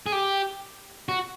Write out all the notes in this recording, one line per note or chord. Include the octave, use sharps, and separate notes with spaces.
G#4
G4
F#4